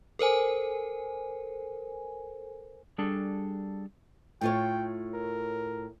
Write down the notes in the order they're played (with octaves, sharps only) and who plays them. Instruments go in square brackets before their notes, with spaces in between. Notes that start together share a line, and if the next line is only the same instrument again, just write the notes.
[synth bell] A4 A#4 C5 G#5
[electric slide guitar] G3 D4 G#4 A4
[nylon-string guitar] A2 F4 C#5 [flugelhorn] G5
[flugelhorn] A#4